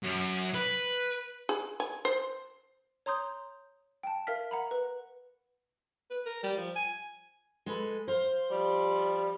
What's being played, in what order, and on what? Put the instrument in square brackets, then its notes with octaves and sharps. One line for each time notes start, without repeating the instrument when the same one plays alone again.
[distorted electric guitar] F#2
B4
[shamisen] G#4
G#5
C5
[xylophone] C#5 A#5 C6 D#6 G6
G5 A5
A#4 E5 F5 F6 B6
F#5 A#5 B5
B4
[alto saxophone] B4
A#4
G3
F3
G#5
[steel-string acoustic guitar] G#3 A4 B4
C5 F5
[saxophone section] F3 G3